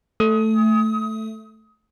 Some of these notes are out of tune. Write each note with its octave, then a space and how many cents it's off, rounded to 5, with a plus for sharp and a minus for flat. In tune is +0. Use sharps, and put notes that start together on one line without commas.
A3 +0 D#6 +25